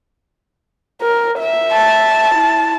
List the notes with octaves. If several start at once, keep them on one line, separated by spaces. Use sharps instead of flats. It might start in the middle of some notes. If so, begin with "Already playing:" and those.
A#4
E5
A5
E4